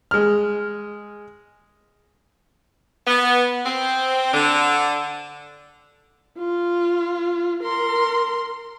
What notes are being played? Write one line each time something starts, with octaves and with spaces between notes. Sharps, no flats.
G#3 F6
B3
C4
D3
F4
A#4 C6